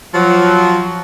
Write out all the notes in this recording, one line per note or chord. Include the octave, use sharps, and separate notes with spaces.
F3 F#3